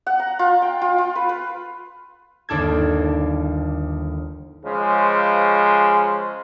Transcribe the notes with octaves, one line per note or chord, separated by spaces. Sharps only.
F#5
A#5
F4
G5
F4
F4
B4
B4
G1 D#2 D4 A4 G#6
C#3 F3 G#3